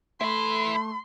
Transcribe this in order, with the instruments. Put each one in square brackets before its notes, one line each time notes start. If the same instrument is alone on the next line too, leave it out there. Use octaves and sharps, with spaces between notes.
[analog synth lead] A3 [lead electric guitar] E4 B4 [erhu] C6